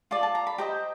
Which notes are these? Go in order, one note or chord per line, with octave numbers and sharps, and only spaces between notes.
F4 A4 D5 A5
A5
A#5
B5
G4 C5 D#5 A#5